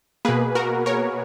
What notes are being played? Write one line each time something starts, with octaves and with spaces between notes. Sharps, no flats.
B2 A#3 G#4 B4
F#4 A#4
A#4 C#5